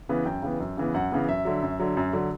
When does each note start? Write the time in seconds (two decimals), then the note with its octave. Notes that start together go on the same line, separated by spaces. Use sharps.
0.09 C#3 E3 B3
0.25 F#2 G5
0.42 C#3 E3 B3
0.60 F#2
0.77 C#3 E3 B3
0.94 F#2 F#5
1.11 C#3 E3 B3
1.28 F#2 E5
1.45 D3 F#3
1.62 F#2
1.80 D3 F#3
1.97 F#2
2.13 D3 F#3